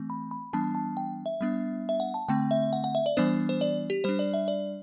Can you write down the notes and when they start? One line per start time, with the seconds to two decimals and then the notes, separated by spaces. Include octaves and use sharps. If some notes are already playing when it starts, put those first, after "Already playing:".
Already playing: E3 A3 C4
0.10 B5
0.31 B5
0.53 E3 G3 B3 D4 A5
0.75 A5
0.97 G5
1.26 E5
1.41 G3 B3 D4
1.89 E5
2.00 F#5
2.14 A5
2.28 D3 A3 C4 G5
2.51 E5
2.73 F#5
2.84 F#5
2.95 E5
3.06 D5
3.17 E3 G3 B3 D4 C5
3.49 C5
3.61 D5
3.90 G4
4.04 G3 D4 C5
4.19 D5
4.34 E5
4.48 D5